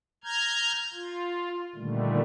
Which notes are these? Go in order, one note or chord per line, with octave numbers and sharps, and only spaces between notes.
A#5 F6 G6 G#6
F4
A#2 D3 D#3 G3 A3